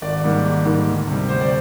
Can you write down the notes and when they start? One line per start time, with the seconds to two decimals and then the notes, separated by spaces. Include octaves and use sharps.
0.02 G#1 D5
0.24 G#2 D#3 G3 A#3
0.44 G#1
0.65 G#2 D#3 G3 A#3
0.87 D2
1.07 C3 G3
1.29 D2 C5
1.41 D5